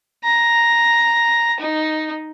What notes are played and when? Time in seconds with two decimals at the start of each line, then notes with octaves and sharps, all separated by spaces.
0.24 A#5
1.60 D#4